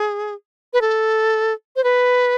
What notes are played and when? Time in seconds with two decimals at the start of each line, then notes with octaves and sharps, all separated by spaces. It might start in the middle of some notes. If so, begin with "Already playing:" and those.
Already playing: G#4
0.73 B4
0.81 A4
1.76 C5
1.84 B4